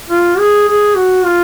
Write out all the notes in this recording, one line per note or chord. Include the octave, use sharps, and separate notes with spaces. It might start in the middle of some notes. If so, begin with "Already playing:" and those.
F4
G#4
G#4
F#4
F4